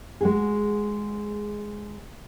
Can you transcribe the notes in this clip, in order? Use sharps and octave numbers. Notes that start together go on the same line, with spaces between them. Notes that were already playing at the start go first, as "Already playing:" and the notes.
G#3 F#4 G#4